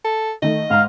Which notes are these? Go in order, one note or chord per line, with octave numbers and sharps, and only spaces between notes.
A4
D#3 A3 D#5
G#2 F5 A#5